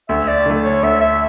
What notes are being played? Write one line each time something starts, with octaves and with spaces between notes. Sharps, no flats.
D2 E5
D5
D3 A3
C#5
D2 E5
E5